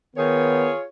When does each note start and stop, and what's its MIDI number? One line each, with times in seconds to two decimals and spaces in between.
0.16 0.73 51
0.16 0.70 59
0.16 0.83 65
0.16 0.83 68
0.16 0.83 73